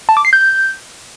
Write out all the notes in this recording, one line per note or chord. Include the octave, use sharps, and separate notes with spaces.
A5
D6
C7
G6